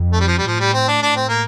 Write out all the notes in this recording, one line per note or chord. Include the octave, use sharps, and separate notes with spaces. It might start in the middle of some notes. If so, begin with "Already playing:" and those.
Already playing: F2
A3
G3
F3
G3
A2 F3
G3
C4
D4
D4
C4
A#3